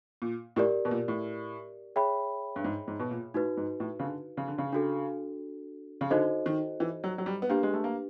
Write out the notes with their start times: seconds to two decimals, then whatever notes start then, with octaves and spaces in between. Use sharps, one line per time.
0.22 A#2
0.56 A2 G4 A#4 D5
0.85 B2
0.91 A#2
1.08 A2
1.96 G#4 C#5 E5 G5 B5
2.56 G2
2.64 G#2
2.88 G#2
3.00 B2
3.11 A#2
3.34 A2 D#4 F#4 B4
3.57 G#2
3.80 A2
3.99 C#3
4.03 D3
4.37 C#3
4.48 D3
4.58 C#3
4.73 D4 F#4 A4
6.01 C#3
6.10 D3 D#4 F#4 A4 C5 D#5
6.46 D#3
6.80 E3
7.04 F#3
7.18 F#3
7.26 G3
7.42 B3
7.49 A#3 D4 G4 B4
7.63 G#3
7.74 A3
7.84 A#3